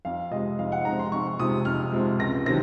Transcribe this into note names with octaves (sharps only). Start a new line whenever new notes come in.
F2 F5
C3 F3 G#3 D#5
F2 F5
F#5
C3 F3 G#3 A#5
C6
F2 C#6
C3 F3 G#3 D#6
F2 F6
C3 F3 G#3
C#2 A#6
C3 D#3 F#3 A#6